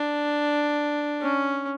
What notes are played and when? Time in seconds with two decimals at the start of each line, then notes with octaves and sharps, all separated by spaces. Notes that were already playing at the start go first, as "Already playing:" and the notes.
Already playing: D4
1.21 C#4